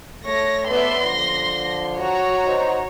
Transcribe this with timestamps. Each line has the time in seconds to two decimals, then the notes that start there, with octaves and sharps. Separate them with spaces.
0.26 A3 C#5 A#6
0.68 B3 D5 E5 C6
1.04 D3 F3 A#6
1.99 F#4 C#5 A#5
2.45 D#4 C5